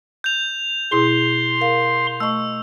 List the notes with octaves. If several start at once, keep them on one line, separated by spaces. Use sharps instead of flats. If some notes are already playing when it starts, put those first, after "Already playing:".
G6 F7
B2 E4 G#4 C6
A#4 F5
A3 D#5 C#6 E6